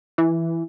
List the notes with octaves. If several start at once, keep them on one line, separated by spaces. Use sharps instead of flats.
E3